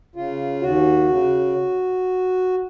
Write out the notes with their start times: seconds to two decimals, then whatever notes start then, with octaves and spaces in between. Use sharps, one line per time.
0.16 C#3 F4
0.61 D#2 F#4
1.08 C#3